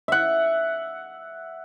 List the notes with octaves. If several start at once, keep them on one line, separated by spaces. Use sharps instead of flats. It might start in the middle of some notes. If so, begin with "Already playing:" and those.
E5 F#5